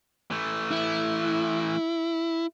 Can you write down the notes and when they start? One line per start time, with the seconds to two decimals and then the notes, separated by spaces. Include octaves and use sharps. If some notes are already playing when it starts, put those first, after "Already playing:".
0.31 E3 A3
0.71 E4